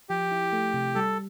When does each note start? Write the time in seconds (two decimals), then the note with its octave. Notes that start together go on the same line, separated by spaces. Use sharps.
0.09 F3 G4
0.32 E4
0.53 A3
0.74 C3
0.95 G3 A4